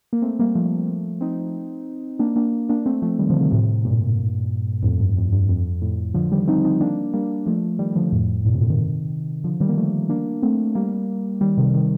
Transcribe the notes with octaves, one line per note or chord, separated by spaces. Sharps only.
A#3
A3 C4
G3 A#3
F3 A3
C4 D#4
A#3 D4
A#3 D4
A#3 D4
A3 C4
F3 A3
D#3 G3
D3 F3
C3 D#3
A2 C3
G2 A#2
F2 A2
G2
F2
G2
F2
F2 A2
D3 F3
D#3 G3
C4 D#4
C4 D#4
A#3 D4
G3 A#3
F3 A3
D#3 G3
G3
D3 F3
F2 A2
G2 A#2
A2 C3
A#2 D3
C3 D#3
D3 F3
D#3 G3
A#3
F3 A3
A#3 D4
A3 C4
G3 A#3
D#3 G3
C3 D#3
C3 D#3